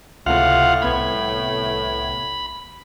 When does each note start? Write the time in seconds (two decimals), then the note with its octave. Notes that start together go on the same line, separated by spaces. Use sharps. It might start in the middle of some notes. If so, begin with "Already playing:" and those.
0.26 C#2 A2 C3 F4 F5 F#5
0.82 C2 B3 B5 G#6